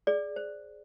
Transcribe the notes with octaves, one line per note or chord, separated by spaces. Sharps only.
G#4 D5
C5